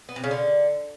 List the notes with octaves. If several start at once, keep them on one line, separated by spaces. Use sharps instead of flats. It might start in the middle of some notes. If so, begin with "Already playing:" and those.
B3
C3
C#3
D3